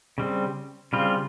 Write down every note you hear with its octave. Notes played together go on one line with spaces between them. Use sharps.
C#3 G3 C4
C#3 G3 C4 F4